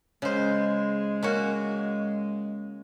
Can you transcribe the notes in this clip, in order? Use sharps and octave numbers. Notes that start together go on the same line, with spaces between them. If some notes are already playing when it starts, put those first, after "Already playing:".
C#3 G#3 C5
A#3 C#4 F#4